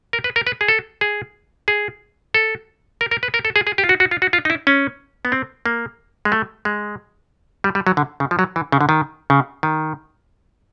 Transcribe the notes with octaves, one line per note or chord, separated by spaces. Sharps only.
A#4
B4
A#4
B4
G#4
A4
G#4
G#4
A4
A#4
A#4
B4
A#4
A4
G#4
G#4
G4
F4
F#4
F#4
F4
F#4
F4
D#4
E4
C#4
B3
C4
A#3
G#3
A3
G#3
G3
G3
F#3
D3
C#3
F3
F#3
E3
C#3
D3
D#3
C#3
D#3